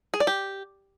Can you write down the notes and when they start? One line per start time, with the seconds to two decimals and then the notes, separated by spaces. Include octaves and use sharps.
0.14 G#4
0.20 D5
0.27 G4